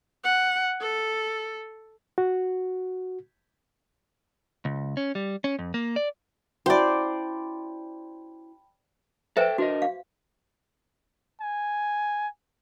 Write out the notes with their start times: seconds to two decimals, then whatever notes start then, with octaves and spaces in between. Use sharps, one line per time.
0.24 F#5
0.81 A4
2.18 F#4
4.65 C#2
4.97 C#4
5.15 G3
5.44 C#4
5.59 F2
5.74 A#3
5.96 D5
6.66 C#4 E4 F#4 C5 D5 G5 A5 B5
9.37 A4 B4 C5 E5 F#5 G5
9.58 D4 F#4 A#4 D#5
9.82 F5
11.41 G#5